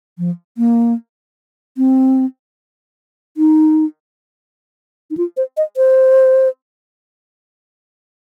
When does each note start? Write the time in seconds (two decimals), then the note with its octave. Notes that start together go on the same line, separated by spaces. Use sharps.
0.18 F3
0.58 A#3
1.77 C4
3.37 D#4
5.10 D#4
5.17 F4
5.37 C5
5.57 D#5
5.77 C5